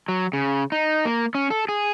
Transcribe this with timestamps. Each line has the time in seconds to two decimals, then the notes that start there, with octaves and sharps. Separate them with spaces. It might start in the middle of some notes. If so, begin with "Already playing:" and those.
0.08 F#3
0.33 C#3
0.72 D#4
1.05 A#3
1.35 C#4
1.50 A4
1.69 G#4